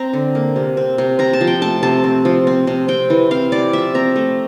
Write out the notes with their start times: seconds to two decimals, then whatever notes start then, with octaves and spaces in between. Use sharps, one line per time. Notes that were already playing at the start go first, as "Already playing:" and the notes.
Already playing: C4 A#5
0.13 D3
0.35 A#3
0.56 C3
0.77 C4
0.98 C3
1.19 C4 A#5
1.33 A5
1.41 F3
1.47 G5
1.62 A3 A5
1.83 C3 A5
2.04 C4
2.25 F3
2.47 C4
2.67 C3
2.88 C4 G5
3.10 E3
3.31 C4 F5
3.52 C3 D5
3.73 F3 E5
3.94 C4 A#5
4.16 A3